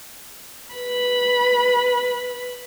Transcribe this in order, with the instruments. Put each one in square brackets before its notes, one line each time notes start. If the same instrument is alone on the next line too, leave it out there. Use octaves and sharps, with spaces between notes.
[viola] B4 B5